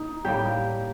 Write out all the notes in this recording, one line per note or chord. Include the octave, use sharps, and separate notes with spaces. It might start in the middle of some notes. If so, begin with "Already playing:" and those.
Already playing: A#3 D#4
A2 G3 A#3 G4